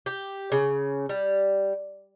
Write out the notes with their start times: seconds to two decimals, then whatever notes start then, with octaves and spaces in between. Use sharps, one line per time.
0.06 G4
0.52 C#3
1.09 G3